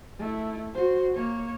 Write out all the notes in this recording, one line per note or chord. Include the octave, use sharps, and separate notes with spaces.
A3 E4
F#4 C5
A#3 C#5